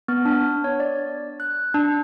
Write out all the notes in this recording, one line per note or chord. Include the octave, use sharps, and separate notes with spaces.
B3
D4
C#5
D5
F#6
D4